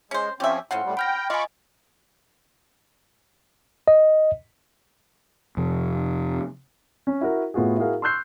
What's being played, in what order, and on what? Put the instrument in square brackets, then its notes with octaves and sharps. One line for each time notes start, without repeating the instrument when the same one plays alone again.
[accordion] G#3 [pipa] C#4 C5
[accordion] F3 C4 C#4 [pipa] G4 E5
[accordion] A2 [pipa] F3 C4 C#4 [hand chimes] F#5
[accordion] A2 G3
[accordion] G5 [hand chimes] B5 F6 A#6
[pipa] F4 [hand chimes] D#5 G#5 [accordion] B5 C#6 D6
[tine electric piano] D#5
[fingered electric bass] F2 C3
[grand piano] C#4
E4 F#4 A#4
A2 B3 F4 F#4 G#4
E4 F#4 G#4 A#4 F5
C6 C#6 E6 F#6 G6 C7